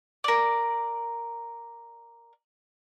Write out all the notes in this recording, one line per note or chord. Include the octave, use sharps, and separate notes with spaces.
A#4 D5